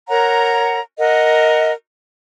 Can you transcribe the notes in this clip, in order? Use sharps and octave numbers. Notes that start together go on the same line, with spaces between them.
A#4 C#5 F#5 A#5
A#4 D#5 F#5